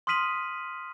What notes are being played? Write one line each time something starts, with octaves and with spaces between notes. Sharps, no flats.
C6 D#6 F6 B6 D#7 F#7